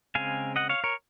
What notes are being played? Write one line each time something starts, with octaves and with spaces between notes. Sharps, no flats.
C#3 G#3 C4 F5 G#5
D#5 F#5
C#5 F5
A#4 C#5